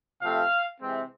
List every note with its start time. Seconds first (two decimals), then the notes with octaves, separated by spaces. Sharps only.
0.22 C3 F3 A3 C4 F5
0.81 C3 E3 G#3 C4